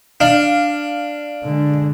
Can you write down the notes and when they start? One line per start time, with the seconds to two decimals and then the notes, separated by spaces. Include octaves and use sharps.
0.20 D4 F5
1.43 D3 G#3